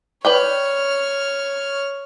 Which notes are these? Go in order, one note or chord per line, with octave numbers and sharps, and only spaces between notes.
B4 C#5 D5 G5 F6